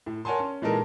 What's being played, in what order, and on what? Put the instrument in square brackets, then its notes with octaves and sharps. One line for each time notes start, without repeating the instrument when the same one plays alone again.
[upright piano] A2
A#4 C#5 F#5 G#5 A5 C6
C#4
A#2 E3 G#3 D#4 A4 A#4